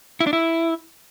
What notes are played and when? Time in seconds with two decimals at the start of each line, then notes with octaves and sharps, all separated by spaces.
0.20 E4
0.27 D4
0.33 E4